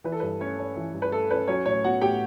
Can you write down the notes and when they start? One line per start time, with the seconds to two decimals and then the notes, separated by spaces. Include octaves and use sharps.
0.04 E3 B4
0.12 A4
0.20 G2 B4
0.40 A3 C#4 C#5
0.59 C#4
0.76 E3
0.94 G2
1.02 B4
1.12 A3 A4
1.31 C#4 B4
1.47 F#3 C#4 C#5
1.66 A2 C#4 C#5
1.84 B3 F#4 F#5
2.01 A2 G4 G5